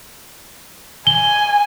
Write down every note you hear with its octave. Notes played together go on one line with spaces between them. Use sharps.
G#5 G7